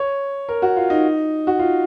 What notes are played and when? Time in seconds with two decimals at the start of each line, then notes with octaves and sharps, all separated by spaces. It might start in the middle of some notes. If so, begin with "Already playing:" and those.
Already playing: C#5
0.49 A#4
0.62 F#4
0.76 F4
0.90 D#4
1.47 F#4
1.59 F4